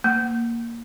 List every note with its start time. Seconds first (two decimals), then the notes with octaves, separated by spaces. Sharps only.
0.04 A#3